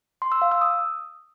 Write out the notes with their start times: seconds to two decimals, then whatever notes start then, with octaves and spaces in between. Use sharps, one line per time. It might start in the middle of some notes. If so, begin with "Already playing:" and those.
0.22 C6
0.32 E6
0.42 F5
0.52 E6
0.61 D#6